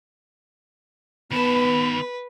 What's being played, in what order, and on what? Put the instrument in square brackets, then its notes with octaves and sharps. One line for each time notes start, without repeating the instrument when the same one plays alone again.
[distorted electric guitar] D#3 A5 [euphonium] B3 [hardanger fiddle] B4 [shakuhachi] B5